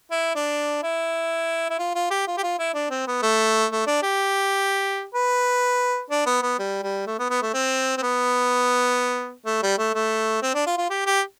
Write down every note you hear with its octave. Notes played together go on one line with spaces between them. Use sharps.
E4
D4
E4
E4
F4
F4
G4
F4
G4
F4
E4
D4
C4
B3
A3
A3
D4
G4
B4
D4
B3
B3
G3
G3
A3
B3
B3
A3
C4
C4
B3
A3
G3
A3
A3
C4
D4
F4
F4
G4
G4